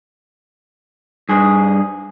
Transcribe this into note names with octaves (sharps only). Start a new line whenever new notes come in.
G2 G#4